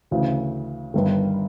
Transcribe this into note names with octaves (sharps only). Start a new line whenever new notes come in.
D2 C#3 E3
G1 G2 D#3